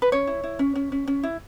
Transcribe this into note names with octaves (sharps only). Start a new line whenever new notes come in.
B4
C#4 C#5
E4
E4
C#4
C#4
C#4
C#4
E4